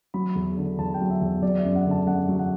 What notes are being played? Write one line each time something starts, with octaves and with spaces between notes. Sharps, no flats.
F#3 B5
E2
D3
E2 A5
G5
F#3
E5
E2
F#3 D5
E5
F#2
F#5
D3
A5
F#2 F#5
F#3
F#5